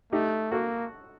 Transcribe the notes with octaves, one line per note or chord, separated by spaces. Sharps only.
A3 D#4 G4
A#3 F#4 A4